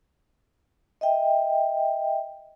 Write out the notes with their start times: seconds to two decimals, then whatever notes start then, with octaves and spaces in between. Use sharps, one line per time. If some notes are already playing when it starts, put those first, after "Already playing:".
1.01 D#5 E5 G5